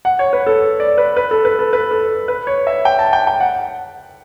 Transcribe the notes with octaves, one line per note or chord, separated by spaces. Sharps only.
F#5
C#5
B4
A4
D5
B4
B4
A4
B4
A4
B4
A4
B4
C#5
E5
G5
A5
G5
G5
F#5